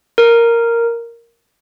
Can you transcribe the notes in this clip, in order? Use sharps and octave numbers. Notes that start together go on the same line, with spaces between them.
A#4